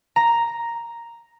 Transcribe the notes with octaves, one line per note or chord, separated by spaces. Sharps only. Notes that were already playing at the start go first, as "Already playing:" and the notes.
A#5